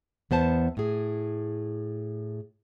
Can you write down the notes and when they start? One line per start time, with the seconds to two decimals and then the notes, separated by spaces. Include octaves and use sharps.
0.31 E2 B3 C5 A5
0.77 A2 G#4